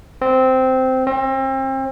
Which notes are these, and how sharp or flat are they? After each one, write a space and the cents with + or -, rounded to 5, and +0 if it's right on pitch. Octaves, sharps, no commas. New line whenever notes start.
C4 -10
C4 +35